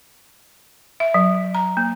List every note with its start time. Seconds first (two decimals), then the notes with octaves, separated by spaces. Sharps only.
1.00 E5
1.14 F#3
1.55 A#5
1.77 A#3